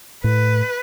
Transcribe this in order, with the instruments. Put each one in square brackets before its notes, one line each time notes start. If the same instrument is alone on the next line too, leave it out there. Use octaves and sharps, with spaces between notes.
[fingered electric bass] A2 [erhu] B4